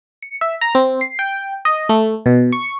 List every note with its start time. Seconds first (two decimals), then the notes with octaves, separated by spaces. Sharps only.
0.23 C#7
0.41 E5
0.61 A#5
0.75 C4
1.01 C7
1.19 G5
1.65 D#5
1.89 A3
2.26 B2
2.52 C#6